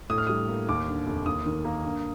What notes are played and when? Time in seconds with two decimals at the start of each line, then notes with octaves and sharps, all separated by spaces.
0.10 A2 D#6
0.18 F6
0.27 G3 D#6
0.48 A#3
0.69 D#2 D6
0.88 D3
1.06 F1
1.26 D#2 D#6
1.46 D#3
1.65 A#3
1.84 G2